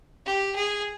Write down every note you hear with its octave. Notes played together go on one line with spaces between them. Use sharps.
G4
G#4